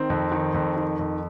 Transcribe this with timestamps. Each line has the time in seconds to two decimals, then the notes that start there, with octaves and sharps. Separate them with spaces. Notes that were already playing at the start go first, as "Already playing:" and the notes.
Already playing: D#3 C4
0.10 F2
0.32 D#3
0.54 F2
0.77 D#3
0.99 F2